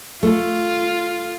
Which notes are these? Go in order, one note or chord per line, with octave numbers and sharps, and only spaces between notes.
A3 F4